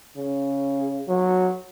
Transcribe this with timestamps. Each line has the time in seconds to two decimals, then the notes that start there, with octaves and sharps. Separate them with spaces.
0.17 C#3
1.08 F#3